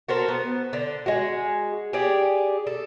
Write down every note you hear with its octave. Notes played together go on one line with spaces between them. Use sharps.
F#4 A4 A#4 C5
B3
D3
G#3 F#4
G4 G#4 D5
A4